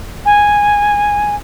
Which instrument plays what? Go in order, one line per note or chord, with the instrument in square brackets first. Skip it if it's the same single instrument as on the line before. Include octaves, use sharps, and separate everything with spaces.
[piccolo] G#5